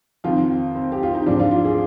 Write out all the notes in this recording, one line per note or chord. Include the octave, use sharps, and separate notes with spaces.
F2 D#3 F4
C4
G4
F4
D#4
G#2 F3 D4
F4
F4
G#4